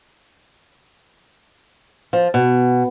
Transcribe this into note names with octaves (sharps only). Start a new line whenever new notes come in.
F3
B2